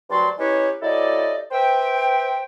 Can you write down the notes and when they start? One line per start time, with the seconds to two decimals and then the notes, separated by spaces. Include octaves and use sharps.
0.10 D2 G2 F#3 F#4 D5 C6
0.38 C#4 D#4 E4 G4 B4 C#5
0.82 F#3 E4 G4 A4 D5 D#5
1.51 B4 C5 E5 G5